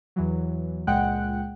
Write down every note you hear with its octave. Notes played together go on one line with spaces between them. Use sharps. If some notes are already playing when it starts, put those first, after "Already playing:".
E2 E3 F#3
C#2 A#2 G#3 F#5 G5 F#6